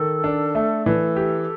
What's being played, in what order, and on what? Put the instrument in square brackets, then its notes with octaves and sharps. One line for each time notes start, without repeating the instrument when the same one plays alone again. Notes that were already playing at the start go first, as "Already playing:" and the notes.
Already playing: [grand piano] D#3 [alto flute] A4
[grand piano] D4
A3
[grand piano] E3 [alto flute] A4
[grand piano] G4